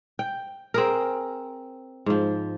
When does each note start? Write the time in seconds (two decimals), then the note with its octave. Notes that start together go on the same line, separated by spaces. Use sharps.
0.19 G5
0.74 C4 G#4 A#4
2.06 G#2 F3